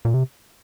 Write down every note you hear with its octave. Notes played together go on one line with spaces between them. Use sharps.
A#2
C3